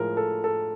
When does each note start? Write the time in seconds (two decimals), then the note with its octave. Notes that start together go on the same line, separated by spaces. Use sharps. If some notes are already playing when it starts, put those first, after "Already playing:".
Already playing: A2 F3 G#3 A#4
0.17 A4
0.44 A4